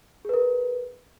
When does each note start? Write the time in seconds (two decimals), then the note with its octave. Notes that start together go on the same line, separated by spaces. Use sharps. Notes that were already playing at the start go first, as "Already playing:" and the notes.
0.25 G#4
0.29 B4
0.34 A#4